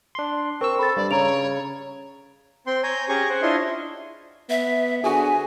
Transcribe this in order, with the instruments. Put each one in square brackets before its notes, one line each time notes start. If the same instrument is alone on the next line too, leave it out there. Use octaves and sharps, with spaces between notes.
[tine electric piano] D4 C6
[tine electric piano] C4 E6 [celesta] A#4 [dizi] C#6
[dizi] A4 [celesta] B5 A6
[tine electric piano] G2 [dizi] D5
[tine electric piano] C#3 [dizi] C#5 [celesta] A#5 D7 F7
[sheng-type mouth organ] C4 G5 C6
C#5 G#5 A#5 G6
C#4 G4 G#4 G#5 A#5 C#6
C5 F#5
D4 E4 F4 C#5 D#5 C6
[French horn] B3 [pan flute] E5
[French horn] D3 [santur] F#4 G#4 [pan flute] G#5